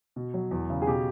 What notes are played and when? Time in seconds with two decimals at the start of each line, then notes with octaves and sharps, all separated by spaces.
0.16 B2
0.34 F#3
0.51 E2
0.70 C#3
0.82 G#4
0.87 B2 G4